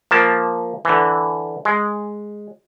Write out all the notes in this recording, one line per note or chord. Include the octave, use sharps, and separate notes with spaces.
F3 A#3 A5
D3 E3
G#3